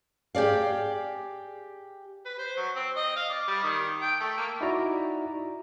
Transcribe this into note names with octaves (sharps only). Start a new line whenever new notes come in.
G4 G#4 D5 F5
B4
C5
F#3
C4
D#5
F5
D5
G3
D#3
G5
A3
A#3
D#4 E4 F#4 D5 E5 A#5